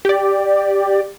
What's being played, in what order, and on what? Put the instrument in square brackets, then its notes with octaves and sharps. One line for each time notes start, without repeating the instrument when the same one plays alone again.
[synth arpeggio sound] G4 D5